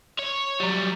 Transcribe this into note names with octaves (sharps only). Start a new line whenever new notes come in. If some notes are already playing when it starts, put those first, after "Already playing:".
C#5
F#3 G3